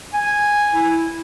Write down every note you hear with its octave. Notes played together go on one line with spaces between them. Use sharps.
G#5
E4